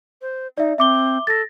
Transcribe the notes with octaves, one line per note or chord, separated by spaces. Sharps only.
C5
D#4 D5 E5
C4 E5 D6 G7
A4 A6 A#6